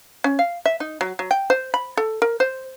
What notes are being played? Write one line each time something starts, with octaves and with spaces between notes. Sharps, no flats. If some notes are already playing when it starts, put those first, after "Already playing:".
C#4
F5
E5
D#4
F#3
F#3
G5
C5
B5
A4
A#4
C5